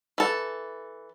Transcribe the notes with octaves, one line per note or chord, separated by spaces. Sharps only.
E3 A4